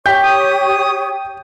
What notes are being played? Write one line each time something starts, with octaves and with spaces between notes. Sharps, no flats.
G4 C#5 G5 C#6 G6 B6
D#6